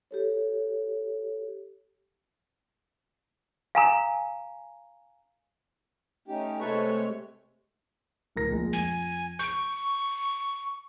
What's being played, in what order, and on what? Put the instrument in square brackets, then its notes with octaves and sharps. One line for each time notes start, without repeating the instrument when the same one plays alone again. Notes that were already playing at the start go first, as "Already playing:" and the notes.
[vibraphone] G4 A4 C#5
[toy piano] F5 G#5 A#5
[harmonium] A3 C#4 D#4 [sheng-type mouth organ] G4
[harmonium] C3 G#3 [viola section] A3 C#5 [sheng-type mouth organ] A4 B4 C#6
[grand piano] D1 A#4 A#6
A#1 G#3
[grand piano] F2 [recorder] G#5
[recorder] C#6 [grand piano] G6 D7